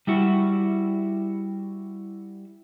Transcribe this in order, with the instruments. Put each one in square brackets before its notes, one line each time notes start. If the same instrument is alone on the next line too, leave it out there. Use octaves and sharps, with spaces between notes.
[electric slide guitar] G3 E4 F#4